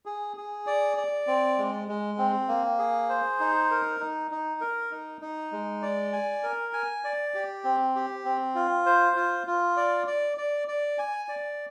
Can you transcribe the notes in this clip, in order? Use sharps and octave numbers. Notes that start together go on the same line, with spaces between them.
G#4
G#4
D5
D5
C4
G#3
G#3
C4
A#3
G#4
C5
D#4
A#4
D#4
D#4
A#4
D#4
D#4
G#3
D5
G#5
A#4
G#5
D5
G4
C4
G4
C4
F4
C5
F4
F4
D5
D5
D5
D5
G#5
D5